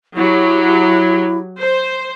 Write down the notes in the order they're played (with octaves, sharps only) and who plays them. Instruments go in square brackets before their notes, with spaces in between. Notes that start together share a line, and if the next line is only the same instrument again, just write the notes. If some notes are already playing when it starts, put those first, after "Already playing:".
[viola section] F#3 G4 [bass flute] E4
[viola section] C5